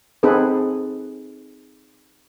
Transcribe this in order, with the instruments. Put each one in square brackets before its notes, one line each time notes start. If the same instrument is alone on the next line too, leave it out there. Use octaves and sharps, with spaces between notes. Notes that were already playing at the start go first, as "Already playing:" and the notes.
[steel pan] C4 D#4 G#4 A4 B4